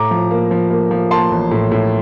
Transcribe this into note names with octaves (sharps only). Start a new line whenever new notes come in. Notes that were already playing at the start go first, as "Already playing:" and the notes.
Already playing: A2 A#5 D6
F3
A#3
F3
A#3
F3
A#3 A5 C6
A1
A2
A2